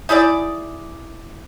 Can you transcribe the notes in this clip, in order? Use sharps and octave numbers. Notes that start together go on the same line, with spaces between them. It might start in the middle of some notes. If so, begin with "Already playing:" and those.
D#4 E4 G#4 D5